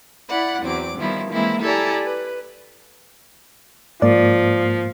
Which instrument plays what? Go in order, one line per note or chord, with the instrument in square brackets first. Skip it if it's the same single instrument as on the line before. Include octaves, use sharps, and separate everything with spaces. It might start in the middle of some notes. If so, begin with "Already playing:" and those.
[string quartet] E4 D5 F#5 B5
E2 F#3 C4 D6
D#3 F3 G3 B3 E4
E3 G#3 A#3 C4 E4
E4 G4 A4 D5 G#5 A#5
B4
[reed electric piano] G#2 A#3 [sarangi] F3 [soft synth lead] D5